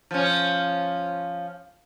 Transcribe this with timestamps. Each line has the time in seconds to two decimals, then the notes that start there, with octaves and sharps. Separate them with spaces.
0.11 F3 C#4